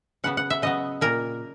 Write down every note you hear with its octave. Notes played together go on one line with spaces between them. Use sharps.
C#3 F#3 B3 F#5
F#5
E5
C#3 F#3 B3 D#5
A#2 A#3 A#4